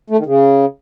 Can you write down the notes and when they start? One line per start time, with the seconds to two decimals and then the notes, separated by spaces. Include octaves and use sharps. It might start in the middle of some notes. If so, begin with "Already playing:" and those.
0.10 A3
0.18 D#3
0.26 C#3